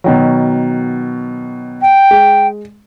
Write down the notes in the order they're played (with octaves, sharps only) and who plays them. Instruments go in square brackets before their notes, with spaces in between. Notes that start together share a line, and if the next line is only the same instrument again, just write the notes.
[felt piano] B2 D#3 F#3
[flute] G5
[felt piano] G#3